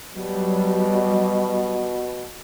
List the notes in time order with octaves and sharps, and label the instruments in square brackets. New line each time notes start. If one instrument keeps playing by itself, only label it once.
[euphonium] B2 [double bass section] F#3 G3